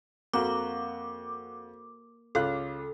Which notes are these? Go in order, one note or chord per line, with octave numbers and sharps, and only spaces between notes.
F2 A#3 F#4 D6
C#2 F4 A4 F#6